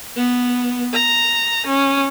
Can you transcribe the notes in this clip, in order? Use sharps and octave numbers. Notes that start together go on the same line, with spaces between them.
B3
A#5
C#4